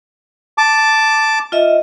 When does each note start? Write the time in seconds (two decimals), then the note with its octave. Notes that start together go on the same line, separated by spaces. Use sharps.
0.58 A5 D6
1.52 F4 D#5 E5